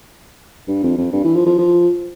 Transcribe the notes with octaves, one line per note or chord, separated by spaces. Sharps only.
G2
F2
F2
G2
E3
F3
F3
F3